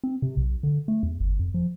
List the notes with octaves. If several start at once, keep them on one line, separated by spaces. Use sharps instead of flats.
C4
C3
B1
D3
A3
E2
G1
F2
F3